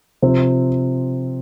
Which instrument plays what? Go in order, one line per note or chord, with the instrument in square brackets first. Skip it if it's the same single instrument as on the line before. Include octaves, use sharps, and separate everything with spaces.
[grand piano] C3 F3 C4